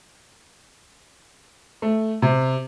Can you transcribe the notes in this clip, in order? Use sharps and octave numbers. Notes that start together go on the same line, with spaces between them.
A3
C3